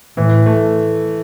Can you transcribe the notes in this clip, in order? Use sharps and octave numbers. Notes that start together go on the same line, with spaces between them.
A2 E3
A3